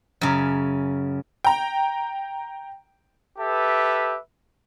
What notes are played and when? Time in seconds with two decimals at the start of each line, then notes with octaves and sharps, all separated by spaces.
0.21 F#2 C#3
1.44 G5 A#5
3.39 G4 A4 B4 E5